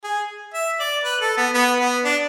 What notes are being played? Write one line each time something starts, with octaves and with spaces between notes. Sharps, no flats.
G#4
E5
D5
B4
A4
B3
B3
B3
D4